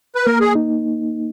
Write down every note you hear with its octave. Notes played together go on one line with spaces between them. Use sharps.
B4
A#3 A#4
G#4
D#4